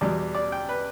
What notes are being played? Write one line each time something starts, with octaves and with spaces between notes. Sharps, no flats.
E2 B2 G3 D5
D5
G5
B4